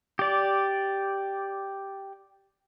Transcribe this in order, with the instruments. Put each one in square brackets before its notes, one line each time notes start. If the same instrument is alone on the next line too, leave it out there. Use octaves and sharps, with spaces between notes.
[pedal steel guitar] G4 D5